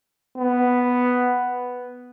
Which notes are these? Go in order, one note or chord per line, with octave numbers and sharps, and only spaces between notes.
B3